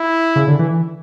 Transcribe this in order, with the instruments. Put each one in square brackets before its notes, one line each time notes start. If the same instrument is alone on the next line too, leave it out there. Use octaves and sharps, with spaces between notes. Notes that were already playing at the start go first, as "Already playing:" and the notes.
Already playing: [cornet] E4
[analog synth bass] C#3
D3
E3